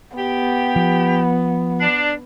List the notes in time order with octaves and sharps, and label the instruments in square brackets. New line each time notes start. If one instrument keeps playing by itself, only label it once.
[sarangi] B3 [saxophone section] G4
[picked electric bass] F3
[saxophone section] D4